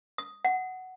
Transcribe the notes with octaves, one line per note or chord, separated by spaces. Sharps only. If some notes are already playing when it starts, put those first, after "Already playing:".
D#6
F#5